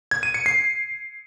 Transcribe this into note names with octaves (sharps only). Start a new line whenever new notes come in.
G#6
D#7
C#7
C7